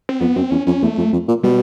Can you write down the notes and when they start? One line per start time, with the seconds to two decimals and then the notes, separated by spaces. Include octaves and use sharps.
0.09 C4
0.20 F2 B3
0.36 F#2 C4
0.51 E2 C#4
0.67 F2 C#4
0.82 E2 A3
0.97 F2
1.13 F2
1.28 A#2
1.43 B2 G3